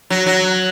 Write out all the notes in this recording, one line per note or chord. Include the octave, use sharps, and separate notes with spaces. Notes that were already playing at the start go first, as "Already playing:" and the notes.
F#3
F#3